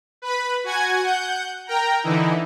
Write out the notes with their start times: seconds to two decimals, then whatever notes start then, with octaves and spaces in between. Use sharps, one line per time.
0.22 B4 B5
0.64 F#4 F#5 G#5 G#6
1.02 F#5 G6
1.67 A#4 G5 A#5
2.04 D3 E3 D#4 E4